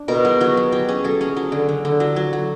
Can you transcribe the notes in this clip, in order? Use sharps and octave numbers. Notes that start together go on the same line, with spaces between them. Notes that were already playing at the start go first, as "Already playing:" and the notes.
Already playing: D4
B2 A#4
F#3 G#4
F#3 F#4
F#3
F#3 G4
C#4 G#4
F#3 A4
C#4 G#4
F#3
D3
D3
D3
F#3
F#3
F#3